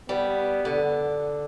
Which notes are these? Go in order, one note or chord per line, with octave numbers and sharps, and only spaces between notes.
G3 B3
D3